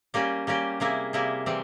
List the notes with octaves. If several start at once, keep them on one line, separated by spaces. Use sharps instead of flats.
G3 A#3 C#4 G4
G3 A#3 C#4 G4
C3 G3 A#3 E4 G#4
C3 G3 A#3 E4 G#4
C3 E3 G3 C4